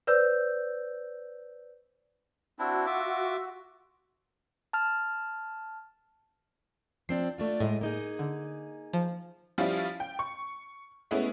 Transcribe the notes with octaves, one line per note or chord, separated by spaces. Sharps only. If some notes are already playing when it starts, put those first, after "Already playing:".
B4 C5 D5 E6 G6
C4 D4 E4 F#4 E6
F4 E5 D6
A5 F6
F3 C4 D4 C7
A3 D4 F4
A2 G#3 D#5
A#3 D#4 G#4
D3
F3
F3 G3 C#4 E4 F4
G5
C#6
G#3 A3 B3 C#4 E4